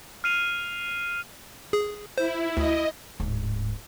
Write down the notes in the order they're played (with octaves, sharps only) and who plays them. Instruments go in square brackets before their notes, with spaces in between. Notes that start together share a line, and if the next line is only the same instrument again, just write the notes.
[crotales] F6 C7 D#7 F7
[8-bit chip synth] G#4
[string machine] E4 [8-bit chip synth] C5
[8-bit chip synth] D2 [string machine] D#5
[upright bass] D1 G#2